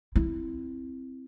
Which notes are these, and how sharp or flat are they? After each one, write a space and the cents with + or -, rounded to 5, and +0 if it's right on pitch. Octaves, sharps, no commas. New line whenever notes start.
C4 +0 E4 +0